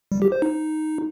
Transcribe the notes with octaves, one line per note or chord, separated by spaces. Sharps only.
G3
G4
C5
D#4